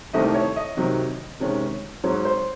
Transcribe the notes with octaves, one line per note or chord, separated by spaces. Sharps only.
C2 C3 D#3 A3 D#5
C#5
D#5
C3 D#3 F#3
C3 D#3 G#3 C#4
G#2 F#3 C4 C#5
C5